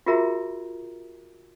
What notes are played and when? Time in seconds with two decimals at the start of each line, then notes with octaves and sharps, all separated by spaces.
0.06 F4 F#4 G#4 A#4 E5 A#5